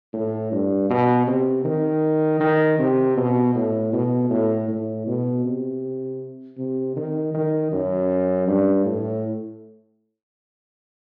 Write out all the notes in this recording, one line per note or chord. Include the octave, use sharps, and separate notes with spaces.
A2
G2
B2
C3
D#3
D#3
C3
B2
A2
B2
A2
A2
B2
C3
C3
D#3
D#3
F#2
G2
A2